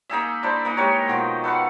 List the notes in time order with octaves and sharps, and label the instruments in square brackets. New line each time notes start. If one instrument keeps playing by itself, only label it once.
[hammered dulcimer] A#3 D#4 G#4 E5
D4 E4 C5
E3 A#3 D#4
G#3 G4 A#4 C#5
B2 D#3 F3
A4 B4 F5 F#5